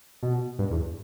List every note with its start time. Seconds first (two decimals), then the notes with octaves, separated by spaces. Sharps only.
0.23 B2
0.59 G2
0.71 E2